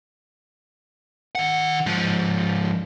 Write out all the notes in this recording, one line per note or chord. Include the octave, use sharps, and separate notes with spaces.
D#3 F#5
G#2 F3